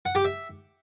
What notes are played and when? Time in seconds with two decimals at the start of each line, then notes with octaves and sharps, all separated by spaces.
0.05 F#5
0.15 G4
0.25 E5